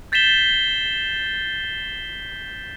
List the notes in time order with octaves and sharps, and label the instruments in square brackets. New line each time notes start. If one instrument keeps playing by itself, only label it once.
[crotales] G6 A6 B6 C7 E7 G7